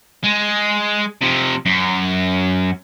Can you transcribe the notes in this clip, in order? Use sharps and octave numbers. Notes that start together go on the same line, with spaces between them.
G#3
C3 F3
F#2